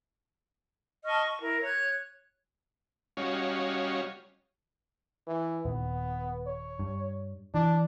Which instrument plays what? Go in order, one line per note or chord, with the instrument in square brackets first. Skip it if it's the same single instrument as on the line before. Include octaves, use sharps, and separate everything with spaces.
[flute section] D#5 A5 C#6 F6
C#6
E4 A#4 E5
C#5 F#6 G#6
[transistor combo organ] G3 C#4 F#4 C#5 D#5 F5
[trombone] E3
[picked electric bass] D#1 [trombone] B3
[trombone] C#5
[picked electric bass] G2
[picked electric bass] E3 [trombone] D4